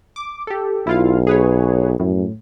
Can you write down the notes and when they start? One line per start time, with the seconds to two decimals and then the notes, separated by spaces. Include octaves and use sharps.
0.16 D6
0.47 G4 A4
0.87 B1 E4 F4 F5
1.27 G#4 B4 C#5
2.00 F#2 A2